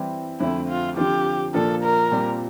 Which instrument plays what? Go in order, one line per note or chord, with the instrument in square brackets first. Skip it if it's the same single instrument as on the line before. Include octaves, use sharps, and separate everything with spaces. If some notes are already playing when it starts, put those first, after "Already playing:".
Already playing: [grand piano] E3 G3 C4 E4 G4
[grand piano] F2 D3 A3 C4 [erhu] E4
[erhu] F4
[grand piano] D3 F3 C4 F4 [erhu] G4
[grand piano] A#2 F3 A#3 D4 F4 [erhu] A4
[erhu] A#4
[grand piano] A#2 G3 C4